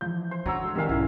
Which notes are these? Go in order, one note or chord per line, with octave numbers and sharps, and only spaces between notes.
E3 F3 G6
C5
D3 F#3 A#5 E6
G#3 F#4 A4
C2 D#3 D5 E5 F5 G#5
B1 G#2 C#4 E4 A#4 G#5 C6